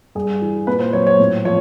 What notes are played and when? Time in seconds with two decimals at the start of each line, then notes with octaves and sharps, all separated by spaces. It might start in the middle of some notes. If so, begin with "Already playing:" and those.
0.15 G2 G#4
0.42 E3
0.67 A#2 B4
0.80 C5
0.93 F#3 C#5
1.07 C#5
1.20 A2
1.45 F3 C#5